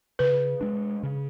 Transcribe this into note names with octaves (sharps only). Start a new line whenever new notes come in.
C#3 B4
G#3 D4
C#3